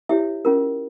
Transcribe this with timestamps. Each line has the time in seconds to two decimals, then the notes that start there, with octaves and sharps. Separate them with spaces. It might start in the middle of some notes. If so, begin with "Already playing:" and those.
0.09 E4 G4 C#5 E5
0.45 C#4 F4 A#4